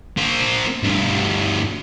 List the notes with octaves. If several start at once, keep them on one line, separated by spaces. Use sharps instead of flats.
A#3 C5
D2 G2